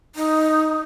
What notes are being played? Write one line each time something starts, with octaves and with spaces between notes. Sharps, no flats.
D#4